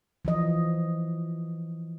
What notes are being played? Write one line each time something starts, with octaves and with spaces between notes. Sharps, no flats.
E3 F3 D#5